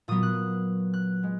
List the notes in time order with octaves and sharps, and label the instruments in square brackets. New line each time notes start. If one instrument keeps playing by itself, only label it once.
[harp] A#2 F#3 B3 D#6
F#6
F#6
G#3 B3